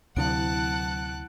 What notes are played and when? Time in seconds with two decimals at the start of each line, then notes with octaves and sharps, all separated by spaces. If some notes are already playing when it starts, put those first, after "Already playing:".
0.16 D2 C3 F#3 E4 F#5 A5 F#6 D7